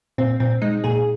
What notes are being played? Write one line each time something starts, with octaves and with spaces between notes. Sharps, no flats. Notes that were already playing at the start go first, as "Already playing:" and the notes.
A#2 C4
A#2 C4
G#3 D#4
A#2 G#4